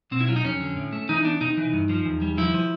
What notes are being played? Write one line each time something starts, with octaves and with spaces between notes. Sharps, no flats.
B2 C4
E4
F#3 F4
D#4
F2 C#4
D3
A2
A3
E3 D#4
B3 D4
C3 D#4
E3
G2
F3
E2
G3
F3 E4
F3